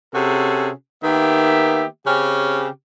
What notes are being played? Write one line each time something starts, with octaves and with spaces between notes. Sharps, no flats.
C3 C#4 F#4 G#4 A4
D#3 A#3 B3 G4 E5
C#3 C4 C#4 G4